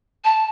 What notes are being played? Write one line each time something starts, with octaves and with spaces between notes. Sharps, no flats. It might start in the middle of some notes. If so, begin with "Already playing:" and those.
A5